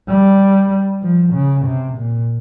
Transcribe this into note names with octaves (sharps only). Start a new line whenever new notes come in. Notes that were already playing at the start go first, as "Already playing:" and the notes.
G3
F3
C#3
C3
A#2